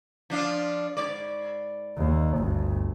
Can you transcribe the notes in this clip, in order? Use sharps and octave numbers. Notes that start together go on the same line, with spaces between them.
F3 D4 F4
G#2 D5
D#2
G1 D2